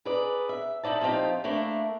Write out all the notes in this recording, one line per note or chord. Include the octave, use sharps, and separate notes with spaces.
G#4 A#4 B4 D5
E5
D#4 E4 D5 A5
F3 C4 D#4 F4 G4
A3 A#3 D4 E4